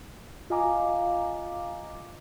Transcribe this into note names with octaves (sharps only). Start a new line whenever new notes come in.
F4 D#5 F5 G#5 A#5 D6